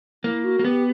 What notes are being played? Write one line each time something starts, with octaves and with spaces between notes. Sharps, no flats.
A#3 E4
F#4
A#3
B3 G4